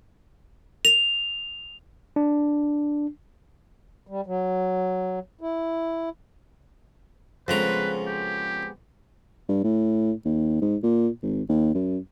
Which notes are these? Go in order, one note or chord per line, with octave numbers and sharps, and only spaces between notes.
F7
D4
G3
F#3
E4
F2 C#3 G#3 B3 B4 C5 A#5
G4
G2
A2
D#2
G#2
A#2
G#1
D#2
F#2